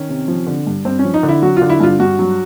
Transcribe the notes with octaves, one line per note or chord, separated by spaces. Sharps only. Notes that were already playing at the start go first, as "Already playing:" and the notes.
Already playing: D#3 C#4
C3
F3
D3
G2
G2 C4
C#4
F3
D#4
D3
E4
F#3 F#4
D3 F4
E4
G2 F4
G2 F#4
F#3